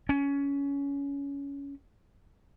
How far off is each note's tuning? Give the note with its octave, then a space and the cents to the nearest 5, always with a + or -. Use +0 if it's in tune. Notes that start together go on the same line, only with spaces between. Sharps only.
C#4 +20